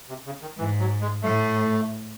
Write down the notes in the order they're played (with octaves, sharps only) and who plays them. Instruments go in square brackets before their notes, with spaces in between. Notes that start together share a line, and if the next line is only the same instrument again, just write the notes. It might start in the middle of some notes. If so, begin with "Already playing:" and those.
[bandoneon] C3
C#3
D#3
[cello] G#2 [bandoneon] E3
[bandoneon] F#3
G#3
[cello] A2 [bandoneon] A3